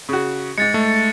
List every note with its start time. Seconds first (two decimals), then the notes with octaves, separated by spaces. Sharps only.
0.09 C#3 F#4
0.58 G#2 G#3 A6 C#7
0.74 A3